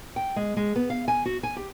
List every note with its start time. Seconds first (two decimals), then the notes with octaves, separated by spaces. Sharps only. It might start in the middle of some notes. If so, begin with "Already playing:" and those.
0.16 G5
0.36 G#3
0.57 G#3
0.76 B3
0.90 F5
1.08 G#5
1.26 F#4
1.43 G#5
1.57 G4